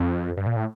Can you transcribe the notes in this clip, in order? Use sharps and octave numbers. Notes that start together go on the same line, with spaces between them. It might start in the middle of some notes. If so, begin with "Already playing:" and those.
Already playing: F2
G2
A#2
A2